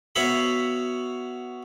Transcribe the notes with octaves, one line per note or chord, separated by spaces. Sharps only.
B3 F#4 C#5 E5 F5 B5